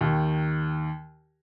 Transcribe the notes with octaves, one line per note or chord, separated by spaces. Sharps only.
D#2 D#3